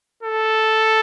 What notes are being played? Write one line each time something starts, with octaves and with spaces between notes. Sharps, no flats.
A4